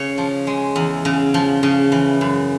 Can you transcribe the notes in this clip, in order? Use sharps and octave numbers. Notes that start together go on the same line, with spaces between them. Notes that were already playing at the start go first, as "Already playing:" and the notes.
Already playing: C#3 C#5
F3
G#3
E2
C#3
F3
C#3
E3
F#2